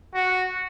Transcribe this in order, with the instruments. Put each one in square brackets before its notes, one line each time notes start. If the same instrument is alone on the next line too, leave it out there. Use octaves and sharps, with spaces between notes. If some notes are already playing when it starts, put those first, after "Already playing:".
[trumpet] F#4